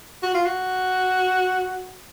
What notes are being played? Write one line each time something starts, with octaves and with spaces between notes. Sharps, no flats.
F#4
F4
F#4